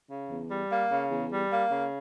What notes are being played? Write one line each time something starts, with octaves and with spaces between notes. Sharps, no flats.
C#3
E2
G3
A#3
C#3
E2
G3
A#3
C#3